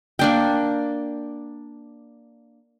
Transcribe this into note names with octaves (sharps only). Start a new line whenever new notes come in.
A#3 D4 G5